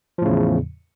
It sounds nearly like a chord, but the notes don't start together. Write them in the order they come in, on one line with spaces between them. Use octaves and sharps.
F3 A2 C#3 E2